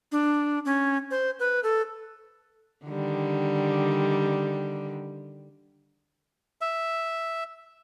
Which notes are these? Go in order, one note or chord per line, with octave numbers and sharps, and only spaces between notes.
D4
C#4
C5
B4
A4
D3 D#3 G3
E5